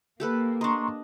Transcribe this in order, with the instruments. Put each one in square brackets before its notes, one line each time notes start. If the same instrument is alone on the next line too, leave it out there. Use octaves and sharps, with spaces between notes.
[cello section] A#3 [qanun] G4 A4 B4
[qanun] D4 D#5 [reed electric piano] A#5 C6 C#6